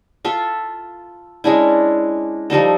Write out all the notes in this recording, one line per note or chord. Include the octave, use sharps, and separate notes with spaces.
F4 A4 E5
G#3 C#4 D4 E4
F3 G3 D#4 A4